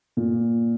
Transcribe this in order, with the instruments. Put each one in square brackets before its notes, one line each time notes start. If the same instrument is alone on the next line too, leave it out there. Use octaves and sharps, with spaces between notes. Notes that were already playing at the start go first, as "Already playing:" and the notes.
[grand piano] A#2